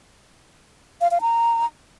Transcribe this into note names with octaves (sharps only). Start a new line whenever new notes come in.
F5
F5
A#5